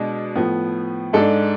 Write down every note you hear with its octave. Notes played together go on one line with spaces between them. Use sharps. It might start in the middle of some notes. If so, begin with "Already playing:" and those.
Already playing: B2 G#3 D4
A2 F3 B3
G#2 G#3 D4 A4